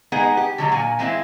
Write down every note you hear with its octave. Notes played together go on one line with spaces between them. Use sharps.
G#3 B3 D#4 G#4 F#5
G4
D3 F#3 G#3
A#2 G#5
E3 G#3 C4 E4 F4